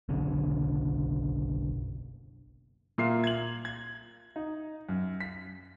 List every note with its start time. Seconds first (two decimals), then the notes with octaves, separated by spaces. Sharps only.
0.09 F#1 B1 D3 C#4
2.98 A#2 A#3 E5 C6 C7
3.24 G#6 F#7
3.65 G#6
4.36 D#4
4.89 F#2
5.20 B6